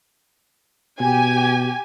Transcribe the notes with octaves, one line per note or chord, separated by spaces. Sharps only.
B2 G4 G#5